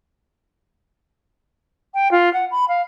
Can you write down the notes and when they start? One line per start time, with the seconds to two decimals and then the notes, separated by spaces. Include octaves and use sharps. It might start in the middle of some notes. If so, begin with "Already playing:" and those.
1.94 G5
2.11 F4
2.33 F#5
2.51 B5
2.68 F5